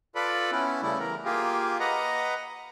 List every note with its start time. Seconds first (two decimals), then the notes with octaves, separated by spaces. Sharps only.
0.15 F4 A4 B4 D5 B5
0.51 B3 C#4 E4
0.82 C#3 G3 A3 E4
0.99 E3 A#4
1.25 A#3 F4 G4 G#4
1.80 B4 D#5 F#5 A#5